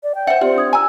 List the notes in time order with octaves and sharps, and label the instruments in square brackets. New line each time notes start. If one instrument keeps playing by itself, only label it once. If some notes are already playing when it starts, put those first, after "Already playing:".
[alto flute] D5
G5
[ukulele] C5 F#5 [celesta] E5
[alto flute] C4 [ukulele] F4 [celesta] G4 D5
[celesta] D4 D#6 G#6
[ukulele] G#5 [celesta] A#5 E6